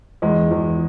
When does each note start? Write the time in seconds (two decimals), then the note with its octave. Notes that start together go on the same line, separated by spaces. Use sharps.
0.22 E2 G#3
0.51 E2